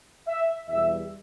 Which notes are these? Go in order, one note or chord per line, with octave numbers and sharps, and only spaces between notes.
E5
E2 B2 G3 E5